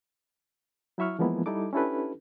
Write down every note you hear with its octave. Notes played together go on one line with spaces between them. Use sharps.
F#3 E4 E5 C#6 F6
E3 F3 G#3 A#3 B3 E4
G3 D#4 E4 A4 D6
C#4 D4 E4 G4 A4 B4